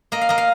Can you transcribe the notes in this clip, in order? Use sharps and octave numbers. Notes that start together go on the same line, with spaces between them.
A#3 D#5
F5
A#3 D#5
F5